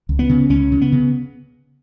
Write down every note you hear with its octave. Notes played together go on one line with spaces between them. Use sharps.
C#2
B3
C#3
C#2 C#4
C#3
B3
C#3